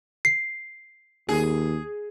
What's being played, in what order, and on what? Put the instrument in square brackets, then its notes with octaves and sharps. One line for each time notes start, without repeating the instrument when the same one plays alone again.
[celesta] C7
[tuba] D#2 [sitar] G#4